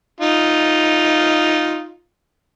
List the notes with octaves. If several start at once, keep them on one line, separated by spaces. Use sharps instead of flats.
D#4 F4